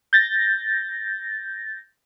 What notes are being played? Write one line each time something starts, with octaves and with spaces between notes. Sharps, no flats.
G6 A6 A#6